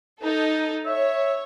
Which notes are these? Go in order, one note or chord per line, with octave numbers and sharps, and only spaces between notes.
D#4 A4
C#5 E5